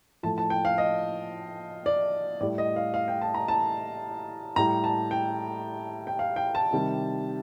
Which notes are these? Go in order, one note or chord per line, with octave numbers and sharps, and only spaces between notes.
A2 F3 A3 A5
A5
G5
F5
D#5
D5
A2 G3 D5
D#5
F5
F5
G5
A5
A#5
A5
A2 G3 A#5
A5
G5
G5
F5
G5
A5
C3 D#3 G3